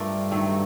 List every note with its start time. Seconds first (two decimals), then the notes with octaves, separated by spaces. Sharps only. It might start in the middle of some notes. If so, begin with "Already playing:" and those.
Already playing: G2 A3 D4 F4 A#4
0.31 D#3 F#3 A3